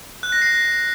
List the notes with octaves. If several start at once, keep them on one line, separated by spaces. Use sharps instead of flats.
F#6
A#6
C7